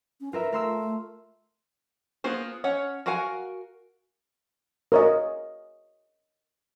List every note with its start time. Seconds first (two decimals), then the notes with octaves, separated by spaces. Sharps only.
0.21 C#4
0.33 F4 A#4 B4 E5
0.53 A3 A#4 C6 E6
2.24 A#3 B3 F4 G#4 C5
2.64 C#4 C#5 F#5
3.06 F#4 A#4 F5 F#5 G#5
4.92 A#4 C#5 D#5